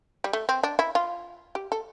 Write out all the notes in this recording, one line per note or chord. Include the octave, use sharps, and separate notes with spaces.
G3
A3
C4
D4
E4
F4
G4
A4